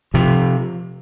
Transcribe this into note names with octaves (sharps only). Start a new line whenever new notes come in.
C3 F3